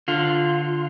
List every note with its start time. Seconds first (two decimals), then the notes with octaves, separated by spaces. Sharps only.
0.08 D3 F4